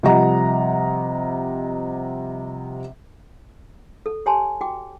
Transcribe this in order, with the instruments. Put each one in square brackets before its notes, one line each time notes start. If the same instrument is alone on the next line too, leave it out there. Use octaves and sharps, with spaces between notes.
[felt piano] C3 F3 G3 D#5 F#5 A#5
[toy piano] A4
G4 C#5 G#5 A5 C6
F#4 G5 D6